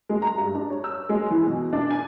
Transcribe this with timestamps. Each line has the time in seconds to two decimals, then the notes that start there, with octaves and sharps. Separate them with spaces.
0.09 G#3
0.22 A#5
0.38 G2
0.55 D4
0.70 C#5
0.84 E6
1.09 G#3
1.30 E3
1.47 B2
1.73 D4
1.91 G#5